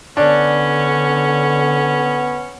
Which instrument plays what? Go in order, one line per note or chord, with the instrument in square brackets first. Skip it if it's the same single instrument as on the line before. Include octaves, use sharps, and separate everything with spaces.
[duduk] D3 [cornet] B3 [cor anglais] C#4 [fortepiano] D4